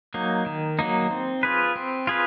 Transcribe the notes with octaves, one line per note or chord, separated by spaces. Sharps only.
F#3 A#3 D#4
D#3
F#3 A#3 D#4
C4
F4 G#4 B4
C4
F4 G#4 B4